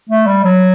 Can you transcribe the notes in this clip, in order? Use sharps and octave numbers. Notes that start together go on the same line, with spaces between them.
A3
G3
F#3